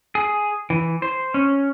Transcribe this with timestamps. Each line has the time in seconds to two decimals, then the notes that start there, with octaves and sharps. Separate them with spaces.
0.15 G#4
0.70 E3
1.02 C5
1.34 C#4